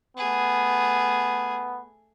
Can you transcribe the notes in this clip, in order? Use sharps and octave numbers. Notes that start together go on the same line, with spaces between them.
A3 B3 G#4